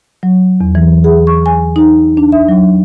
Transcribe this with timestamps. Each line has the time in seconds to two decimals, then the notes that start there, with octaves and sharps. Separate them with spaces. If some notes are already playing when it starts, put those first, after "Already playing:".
0.23 F#3
0.61 E2
0.75 E3
1.04 G#4
1.27 C#6
1.46 G#5
1.76 D#4
2.17 D4
2.32 E5
2.48 F#3